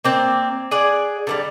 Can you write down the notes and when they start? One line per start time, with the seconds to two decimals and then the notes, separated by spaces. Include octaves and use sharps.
0.05 A#3 C4 D5
0.71 G#4 D5 F#5
1.27 D3 D#3 G3